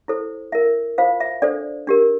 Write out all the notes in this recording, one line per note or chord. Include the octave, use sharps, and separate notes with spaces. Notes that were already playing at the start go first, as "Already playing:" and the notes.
E4 A4 C5
E4 A#4 E5
F4 C5 F5
E5
D4 A4 C5 D5
D4 G4 A#4